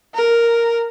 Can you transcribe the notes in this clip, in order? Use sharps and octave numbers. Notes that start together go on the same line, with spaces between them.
A#4